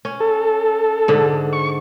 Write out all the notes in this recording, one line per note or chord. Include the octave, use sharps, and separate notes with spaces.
C#4
A4
G#2 D3
C#6